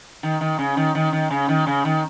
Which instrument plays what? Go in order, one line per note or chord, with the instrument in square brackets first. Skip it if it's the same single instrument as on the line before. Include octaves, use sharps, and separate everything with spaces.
[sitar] D#3
D#3
C#3
D#3
D#3
D#3
C#3
D#3
C#3
D#3